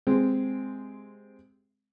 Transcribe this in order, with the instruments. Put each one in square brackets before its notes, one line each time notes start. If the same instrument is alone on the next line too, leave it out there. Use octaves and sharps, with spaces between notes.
[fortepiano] C3 G#3 C4